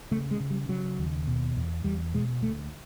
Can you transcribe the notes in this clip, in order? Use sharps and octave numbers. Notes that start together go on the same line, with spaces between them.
C#3 A3
G#3
C#3
G3
C#3 F#3
D#2
B2
E2
E2 G3
B2 G#3
D2 A3